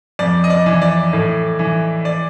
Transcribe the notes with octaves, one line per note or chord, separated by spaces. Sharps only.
F2 D5
D#5
D5
E3
D5
A2
E3
D5